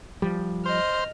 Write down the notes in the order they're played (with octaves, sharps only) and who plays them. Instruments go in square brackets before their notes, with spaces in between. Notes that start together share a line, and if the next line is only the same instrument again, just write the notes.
[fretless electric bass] F3 G3
[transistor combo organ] C5 [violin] D#5 F6